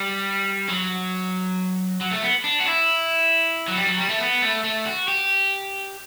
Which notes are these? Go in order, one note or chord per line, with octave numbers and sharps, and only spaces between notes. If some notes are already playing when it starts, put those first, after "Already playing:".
Already playing: G3
F#3
F#3
A3
B3
D4
F#4
E4
F#3
G3
F#3
G3
A3
B3
A3
A3
F#4
G4